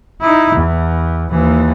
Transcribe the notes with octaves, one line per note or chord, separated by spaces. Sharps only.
D#4 E4
E2
D#2 E3